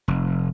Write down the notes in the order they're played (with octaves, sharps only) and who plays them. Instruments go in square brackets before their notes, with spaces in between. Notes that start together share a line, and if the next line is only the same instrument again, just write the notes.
[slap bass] F1